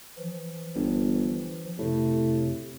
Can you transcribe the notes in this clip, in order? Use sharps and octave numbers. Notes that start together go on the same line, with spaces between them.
E3 F3
G1
F2 A2 C3